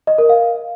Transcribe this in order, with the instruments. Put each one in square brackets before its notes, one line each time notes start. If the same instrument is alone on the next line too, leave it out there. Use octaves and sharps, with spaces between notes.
[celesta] D#5
A#4
F5